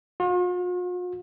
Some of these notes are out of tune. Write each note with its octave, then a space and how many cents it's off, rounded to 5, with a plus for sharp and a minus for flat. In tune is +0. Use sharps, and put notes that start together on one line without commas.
F4 +45